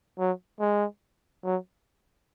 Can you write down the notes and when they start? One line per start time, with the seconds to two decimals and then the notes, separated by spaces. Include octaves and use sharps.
0.19 F#3
0.60 G#3
1.44 F#3